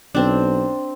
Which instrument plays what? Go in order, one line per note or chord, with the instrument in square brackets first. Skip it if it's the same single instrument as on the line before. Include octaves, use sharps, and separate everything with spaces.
[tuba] B1 [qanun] C4 D4